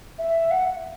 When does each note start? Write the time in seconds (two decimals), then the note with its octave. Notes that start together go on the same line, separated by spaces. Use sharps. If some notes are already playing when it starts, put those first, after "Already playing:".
0.18 E5
0.51 F#5